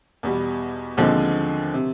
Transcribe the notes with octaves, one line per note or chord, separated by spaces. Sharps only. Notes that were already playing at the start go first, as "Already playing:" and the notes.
E2 B2 G3
D#2 D3 F3 G#3 C4
C3